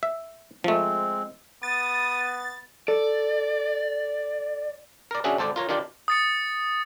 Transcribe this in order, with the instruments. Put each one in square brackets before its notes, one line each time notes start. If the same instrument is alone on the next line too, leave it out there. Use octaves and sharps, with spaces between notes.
[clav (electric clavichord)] E5
[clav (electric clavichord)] F3 A3 [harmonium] G#3 C4
[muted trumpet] B3 [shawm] D#6 [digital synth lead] A6
[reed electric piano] A4 [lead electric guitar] D5
[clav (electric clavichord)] A#4 D5
C#4 D4 F#4 G#4 E5
G#1 A4 C5 D5
F4 A#4 C#5
D#3 D4 F4 G4 D5
[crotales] D#6 A6 C#7